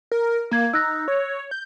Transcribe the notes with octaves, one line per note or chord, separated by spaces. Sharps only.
A#4
A#3 F5 G#6
D#4 E6 F#6 A#6
C#5
G6